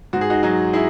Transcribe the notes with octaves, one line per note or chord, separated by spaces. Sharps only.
G#2 F#4
G#4
D#4 F#4
F#3 D#4 F#4
E4 G#4